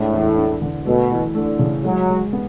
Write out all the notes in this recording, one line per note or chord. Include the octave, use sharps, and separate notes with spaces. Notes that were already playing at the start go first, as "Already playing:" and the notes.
Already playing: A2 G#3 D4
E2
D4
D3
B2 A3
E3
D3 A3
C#3
F#3 G#3
G#3
B3